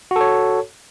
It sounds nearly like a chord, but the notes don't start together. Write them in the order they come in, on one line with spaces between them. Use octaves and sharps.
F#4 A4 C#5